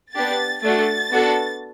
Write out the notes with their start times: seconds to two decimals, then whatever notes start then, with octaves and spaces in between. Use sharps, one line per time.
0.14 B3 D4 G4 A6
0.63 A3 D4 F#4 A4 A6
1.12 B3 D4 F#4 A4